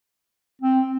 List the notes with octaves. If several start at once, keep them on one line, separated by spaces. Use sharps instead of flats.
C4